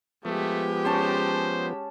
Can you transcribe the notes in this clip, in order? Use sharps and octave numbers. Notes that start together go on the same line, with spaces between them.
F3 G#3 A3 B3 G4
C#4 C5 A5 C#6